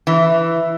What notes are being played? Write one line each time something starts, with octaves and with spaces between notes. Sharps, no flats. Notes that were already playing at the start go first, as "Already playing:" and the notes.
E3